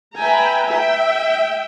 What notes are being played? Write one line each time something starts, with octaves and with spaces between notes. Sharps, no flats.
B4 E5 G5 G#5 A#5
E5 G5